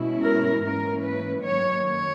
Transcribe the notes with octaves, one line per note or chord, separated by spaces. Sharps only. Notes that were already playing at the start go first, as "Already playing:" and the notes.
Already playing: B2 G#3 C#4 E4
A#4
G#2 E3 A#3 C#4 A#4
B4
F#2 D#3 A#3 C#5
C#5